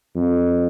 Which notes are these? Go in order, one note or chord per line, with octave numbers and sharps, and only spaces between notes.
F2